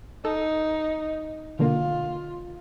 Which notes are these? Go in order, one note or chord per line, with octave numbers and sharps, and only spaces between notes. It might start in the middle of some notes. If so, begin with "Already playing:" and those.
D#4 A4
B2 D3 A#3 F4